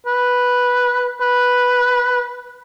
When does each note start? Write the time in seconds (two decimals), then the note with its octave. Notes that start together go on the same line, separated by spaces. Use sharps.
0.06 B4
1.21 B4